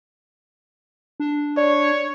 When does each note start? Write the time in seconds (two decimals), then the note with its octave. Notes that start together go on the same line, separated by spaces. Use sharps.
1.20 D4
1.57 C#5 D5